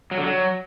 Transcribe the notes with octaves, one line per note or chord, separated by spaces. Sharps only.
F#3
D3
F#3